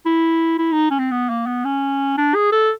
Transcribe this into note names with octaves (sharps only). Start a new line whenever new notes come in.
E4
E4
D#4
C#4
C4
B3
A#3
B3
C#4
D4
G#4
A4